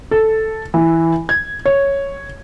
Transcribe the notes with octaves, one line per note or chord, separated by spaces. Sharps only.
A4
E3
G#6
C#5